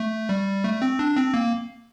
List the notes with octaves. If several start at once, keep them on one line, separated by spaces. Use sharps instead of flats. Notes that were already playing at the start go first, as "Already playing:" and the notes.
Already playing: A3
G3
A3
C4
D4
C4
A#3